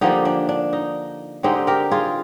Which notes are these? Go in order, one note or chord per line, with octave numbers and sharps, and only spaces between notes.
D3 F3 A#3 D#4 G4
D4
D4
D#4
D3 G#3 C4 D#4 G4
G4 A#4
F4 G#4